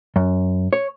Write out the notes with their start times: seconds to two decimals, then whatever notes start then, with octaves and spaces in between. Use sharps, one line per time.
0.16 F#2
0.73 C#5